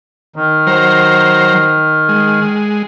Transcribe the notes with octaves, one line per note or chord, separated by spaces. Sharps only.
D#3
F#3 C5 A#5
G#3